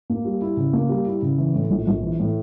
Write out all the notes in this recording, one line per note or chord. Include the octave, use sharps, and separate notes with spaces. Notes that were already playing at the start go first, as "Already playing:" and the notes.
A#3
G3
E4
C#3
A#3
G3
E4
C#3
E3
A2
A#1
A#1
E3
A2